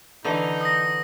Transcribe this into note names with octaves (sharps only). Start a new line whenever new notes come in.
D3 E3 D#4
D#6 A#6